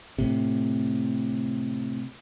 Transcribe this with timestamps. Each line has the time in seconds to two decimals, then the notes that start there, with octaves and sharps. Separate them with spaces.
0.18 A2 C3